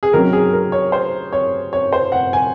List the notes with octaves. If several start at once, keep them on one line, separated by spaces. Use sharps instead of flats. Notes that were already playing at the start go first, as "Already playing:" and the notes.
G#4
C3 D#3 F#3 C#4 A#4
G#4
A#4
C#5
C5
C#5
C#5
C5
F#5
G#5